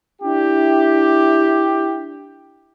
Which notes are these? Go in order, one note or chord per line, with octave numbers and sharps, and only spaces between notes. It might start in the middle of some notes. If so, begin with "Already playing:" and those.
D4 E4 G4